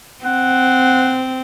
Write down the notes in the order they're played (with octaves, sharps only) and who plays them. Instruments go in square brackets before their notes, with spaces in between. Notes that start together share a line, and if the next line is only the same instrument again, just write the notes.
[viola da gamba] C4 [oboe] F#5